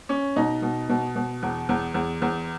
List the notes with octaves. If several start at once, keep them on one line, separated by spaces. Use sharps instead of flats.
C#4
B2 D#4
B2
B2
B2
E2
E2
E2
E2